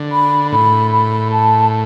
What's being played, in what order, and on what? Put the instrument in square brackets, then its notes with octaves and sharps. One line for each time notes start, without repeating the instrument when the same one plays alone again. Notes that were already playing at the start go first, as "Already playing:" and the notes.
Already playing: [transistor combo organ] D3
[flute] B5
[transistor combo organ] A2 [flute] B5
[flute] B5
A5